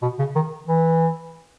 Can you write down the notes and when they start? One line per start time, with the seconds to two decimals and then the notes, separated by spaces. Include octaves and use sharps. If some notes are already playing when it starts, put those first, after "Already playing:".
0.02 B2
0.19 C#3
0.35 D#3
0.68 E3